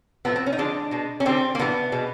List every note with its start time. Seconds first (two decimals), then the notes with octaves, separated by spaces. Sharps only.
0.25 A2 F3 A3 B3
0.36 C4
0.46 C#4
0.53 D#4
0.58 D3 F3 G#3 D4
0.91 B2 G#3
1.20 C#4
1.25 D3 G3 C4
1.55 A#3
1.59 A2 E3 G3 B3
1.92 B2 G#3